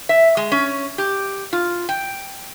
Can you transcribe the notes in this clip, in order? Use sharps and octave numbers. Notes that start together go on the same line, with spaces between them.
E5
G#3
C#4
G4
F4
G5